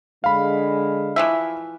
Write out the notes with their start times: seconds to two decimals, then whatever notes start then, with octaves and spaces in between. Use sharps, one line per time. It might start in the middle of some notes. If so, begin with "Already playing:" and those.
0.24 D3 G#3 F5 B5
1.16 E3 F3 E5